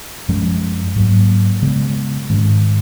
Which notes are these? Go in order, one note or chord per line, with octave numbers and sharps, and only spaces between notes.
F#2 F3 G#3 C#4
G#2 F#3 A#3
C#3 G#3 B3
G#2 D#3 G#3 C#4